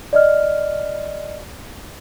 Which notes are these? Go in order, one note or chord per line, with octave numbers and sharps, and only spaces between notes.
D5 D#5 F6